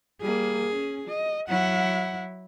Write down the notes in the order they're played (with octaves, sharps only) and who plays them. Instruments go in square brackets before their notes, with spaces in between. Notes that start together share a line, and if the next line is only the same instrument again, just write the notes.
[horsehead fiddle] G3 A#3 [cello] G#4
[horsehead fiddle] C#4
D#5
[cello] F#3 E4 [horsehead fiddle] F#5